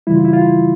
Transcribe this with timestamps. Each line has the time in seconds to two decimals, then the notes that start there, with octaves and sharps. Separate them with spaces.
0.07 F#2 C#3 E3 G3 E4
0.15 F4
0.25 E4
0.33 F4
0.42 E4